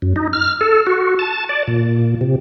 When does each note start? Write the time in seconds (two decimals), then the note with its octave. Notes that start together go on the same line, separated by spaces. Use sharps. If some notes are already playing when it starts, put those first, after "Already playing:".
0.02 F#2
0.16 D#4
0.33 F6
0.61 A4
0.87 F#4
1.19 A5
1.49 D5
1.67 A#2
2.21 C3